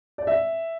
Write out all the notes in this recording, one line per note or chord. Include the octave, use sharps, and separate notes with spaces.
D5
E5